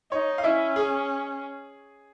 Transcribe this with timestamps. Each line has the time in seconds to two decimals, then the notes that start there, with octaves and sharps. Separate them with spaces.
0.12 D#4 C#5
0.38 F5
0.44 C#4 E4 E5
0.76 G#4 G#5